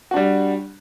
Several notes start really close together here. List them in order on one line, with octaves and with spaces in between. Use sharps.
F#4 D4 G3